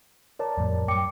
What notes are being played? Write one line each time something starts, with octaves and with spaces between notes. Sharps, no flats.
A#4 C#5 D5 A5
F2 A2 G3
F#2 G5 D6 C#7